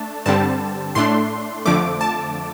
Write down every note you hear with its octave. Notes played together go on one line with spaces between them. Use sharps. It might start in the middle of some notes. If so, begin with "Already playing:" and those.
Already playing: A3 D4 A5
G2 D3 G3 C4 A5
A2 A3 D4 C6
F2 D3 F3 A3 D6
A5